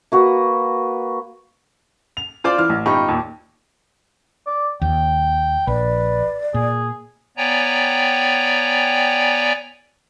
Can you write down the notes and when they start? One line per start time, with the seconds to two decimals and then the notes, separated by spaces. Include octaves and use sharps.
0.12 A#3 F#4 B4
2.17 F7
2.44 F4 C5 D5 D6
2.58 E3 F6
2.69 A1
2.86 G1 D#4 F4 G4 B5 C#6
3.08 D#2 A#2
4.47 D5
4.82 D#2 G5
5.67 A#1 B4 D5
6.54 A#2 G#4
7.37 B3 C#5 D5 G5 G#5 A#5